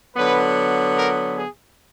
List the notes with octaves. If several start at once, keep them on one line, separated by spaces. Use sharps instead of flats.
D3 F#3 B3 B4
A#4
G#4